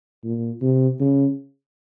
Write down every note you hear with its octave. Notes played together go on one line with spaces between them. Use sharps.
A#2
C3
C#3